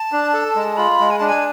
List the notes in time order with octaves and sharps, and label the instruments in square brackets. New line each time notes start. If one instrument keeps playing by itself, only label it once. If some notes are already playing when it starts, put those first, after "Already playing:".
Already playing: [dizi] A5
[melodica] D4
A4
G#3
[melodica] F4 [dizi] B5
[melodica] G#3
[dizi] G#5
[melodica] D4 [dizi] A5
[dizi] G#5